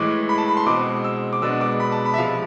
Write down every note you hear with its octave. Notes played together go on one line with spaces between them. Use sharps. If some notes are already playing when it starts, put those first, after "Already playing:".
Already playing: A2 E3 G#3 D6
B5
A5
B5
C6
B2 G#3 C4 D6
E6
D6
B2 G#3 B3 D4 E6
D6
B5
A5
B5
E5
C3 F3 G#3 F5